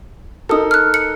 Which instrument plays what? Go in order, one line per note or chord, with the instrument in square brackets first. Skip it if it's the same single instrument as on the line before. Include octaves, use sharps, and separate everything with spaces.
[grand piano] D#4 A4 [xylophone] A#4 D#6
[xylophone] F6 F#6
C#7